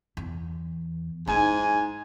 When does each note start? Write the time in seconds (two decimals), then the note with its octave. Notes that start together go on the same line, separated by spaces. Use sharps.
0.17 E2
1.27 G#2 D#4 E4 G#5